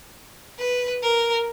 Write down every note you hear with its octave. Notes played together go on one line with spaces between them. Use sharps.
B4
A#4